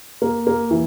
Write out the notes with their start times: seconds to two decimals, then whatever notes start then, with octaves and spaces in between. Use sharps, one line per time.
0.22 A#3
0.47 A#3
0.71 E3